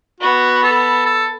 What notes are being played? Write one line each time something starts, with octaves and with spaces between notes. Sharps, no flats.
B3 F#4
A4
A4